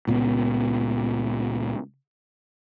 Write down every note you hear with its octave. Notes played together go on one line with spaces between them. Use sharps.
C#2 A#2 C#3 B3